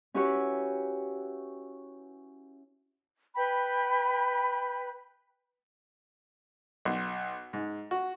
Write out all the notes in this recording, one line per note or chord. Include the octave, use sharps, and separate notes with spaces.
C#4 E4 F#4 G4 B4 C#5
B4 G5 B5
B1
G#2
F#4